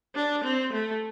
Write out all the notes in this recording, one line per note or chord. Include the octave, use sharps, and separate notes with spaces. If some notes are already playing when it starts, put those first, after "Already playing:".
D4
C4
A3